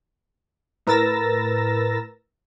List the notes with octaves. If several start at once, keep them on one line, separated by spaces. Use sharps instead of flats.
A2 A#4 B4 E6 A6 A#6